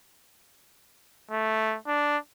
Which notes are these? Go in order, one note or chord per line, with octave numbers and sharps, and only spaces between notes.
A3
D4